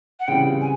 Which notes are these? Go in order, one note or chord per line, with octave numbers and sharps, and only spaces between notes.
F#5
C#3 E3 G3 C4 F4 G5
G#5